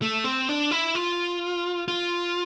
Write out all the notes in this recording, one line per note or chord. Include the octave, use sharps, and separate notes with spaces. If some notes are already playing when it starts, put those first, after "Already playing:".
A3
C4
D4
E4
F4
F4